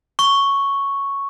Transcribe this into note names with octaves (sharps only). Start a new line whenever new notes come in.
C#6